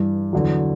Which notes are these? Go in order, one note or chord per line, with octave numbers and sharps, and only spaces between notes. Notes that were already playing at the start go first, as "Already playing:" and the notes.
Already playing: G2 E3 G3
E2 D3 F#3